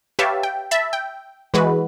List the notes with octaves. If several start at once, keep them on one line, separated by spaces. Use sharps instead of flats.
G4 B4 C#5 E5 F5 A5
G5
E5 A5 B5
G5
E3 G#3 F#4 B4